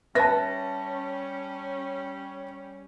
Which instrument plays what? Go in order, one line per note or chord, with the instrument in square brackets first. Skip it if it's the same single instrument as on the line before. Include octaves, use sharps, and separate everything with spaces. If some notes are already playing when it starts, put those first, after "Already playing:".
[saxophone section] G3 C#4 [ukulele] B4 E5 [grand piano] A5 A#6